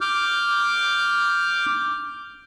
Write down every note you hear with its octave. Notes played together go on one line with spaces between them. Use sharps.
D6 F6 G6